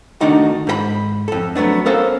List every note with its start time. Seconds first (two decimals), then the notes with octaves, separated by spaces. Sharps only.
0.21 D#3 A3 D4 D#4 F#4
0.67 G#2 A4 B5
1.28 F2 A4
1.55 F#3 A3 B3 D4
1.86 B3 C#4 A4 A#4 C5 F5